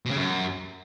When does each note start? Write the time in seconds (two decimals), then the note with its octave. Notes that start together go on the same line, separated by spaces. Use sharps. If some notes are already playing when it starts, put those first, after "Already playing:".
0.06 B2
0.11 C#3
0.16 F#2